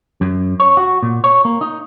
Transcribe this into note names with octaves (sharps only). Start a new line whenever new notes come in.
F#2
C#5
F#4
A#2
C#5
A#3
D#4